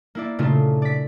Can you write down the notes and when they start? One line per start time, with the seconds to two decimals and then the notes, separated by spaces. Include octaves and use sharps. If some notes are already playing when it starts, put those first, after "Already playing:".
0.15 A#3 E4 D5
0.39 A#2 C#3 A3 D4 F4
0.82 D5 B6